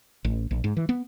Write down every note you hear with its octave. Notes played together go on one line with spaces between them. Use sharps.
A1
A#1
G#2
E3
B3